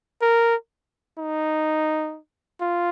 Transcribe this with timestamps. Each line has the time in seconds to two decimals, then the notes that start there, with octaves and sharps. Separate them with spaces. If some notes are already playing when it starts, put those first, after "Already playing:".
0.22 A#4
1.18 D#4
2.61 F4